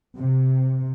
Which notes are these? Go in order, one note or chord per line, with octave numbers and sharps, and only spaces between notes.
C3